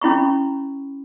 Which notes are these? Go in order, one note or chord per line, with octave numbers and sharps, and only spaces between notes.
C#4 E4 B5 C#6